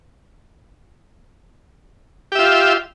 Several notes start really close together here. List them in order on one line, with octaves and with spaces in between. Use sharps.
G4 E5 F4